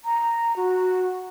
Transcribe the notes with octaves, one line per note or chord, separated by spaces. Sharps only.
A#5
F#4